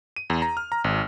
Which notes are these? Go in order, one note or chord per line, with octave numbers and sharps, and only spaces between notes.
D#7
E2
A#5
F6
A#5
G#1